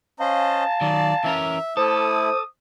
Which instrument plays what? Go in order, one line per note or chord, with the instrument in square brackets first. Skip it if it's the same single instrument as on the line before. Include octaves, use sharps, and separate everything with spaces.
[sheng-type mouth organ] C#4 C5 D#5 [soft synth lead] F5 [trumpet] A5
[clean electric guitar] D#3 F#3 [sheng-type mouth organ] D5
[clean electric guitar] E3 C#4 A#4 [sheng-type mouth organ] E5
[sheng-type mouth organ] A3 E4 [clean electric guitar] A4 [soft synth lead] C5 [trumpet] D#6